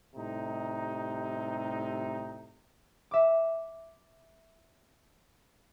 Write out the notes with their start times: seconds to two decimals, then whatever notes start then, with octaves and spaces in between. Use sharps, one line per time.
0.15 A2 C3 G3 D#4
3.11 E5 D6